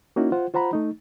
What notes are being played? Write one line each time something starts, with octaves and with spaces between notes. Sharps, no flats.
A#3 C#4 D#4 E4 F#4
F4 C5 F#5
F4 C5 F#5 A#5 B5
A3 D#4